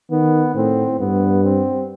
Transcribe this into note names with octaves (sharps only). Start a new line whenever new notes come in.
D#3 B3
A2 C4
G2 B3
C4